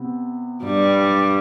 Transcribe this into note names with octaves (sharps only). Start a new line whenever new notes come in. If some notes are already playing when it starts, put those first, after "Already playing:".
Already playing: C3 B3
G2 G3